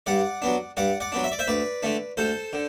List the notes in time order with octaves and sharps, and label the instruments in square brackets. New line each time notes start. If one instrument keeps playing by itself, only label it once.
[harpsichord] G2 D5 F#5
F#3 B3 D4
G2 D5 F#5
D5 F#5
F#3 B3 D4
E5
D5
C5 E5
D2 B4 D5
D3 A3 D4
D2 A4 C5
D3